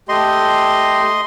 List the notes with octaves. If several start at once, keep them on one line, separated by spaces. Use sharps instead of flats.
A3 G4 D#5 C6